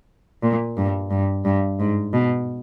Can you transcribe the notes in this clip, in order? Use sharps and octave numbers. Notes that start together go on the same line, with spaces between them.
A#2
G2
G2
G2
G#2
B2